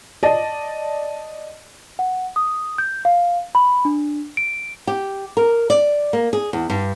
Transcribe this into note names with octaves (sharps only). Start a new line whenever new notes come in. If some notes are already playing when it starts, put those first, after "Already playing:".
D5 D#5 A5
F#5
D#6
G6
F5
B5
D4
D7
G4
A#4
D5
A#3
G#4
E2
G2